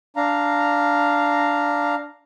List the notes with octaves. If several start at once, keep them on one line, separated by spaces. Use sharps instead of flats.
D4 F5 A#5